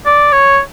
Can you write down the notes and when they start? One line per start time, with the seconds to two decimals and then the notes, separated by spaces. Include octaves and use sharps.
0.06 D5
0.33 C#5